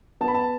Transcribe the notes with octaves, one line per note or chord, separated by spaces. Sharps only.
B3 A5
B5
A5